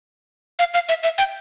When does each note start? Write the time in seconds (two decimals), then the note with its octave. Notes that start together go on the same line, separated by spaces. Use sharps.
0.59 F5
0.74 F5
0.89 E5
1.03 E5
1.18 G5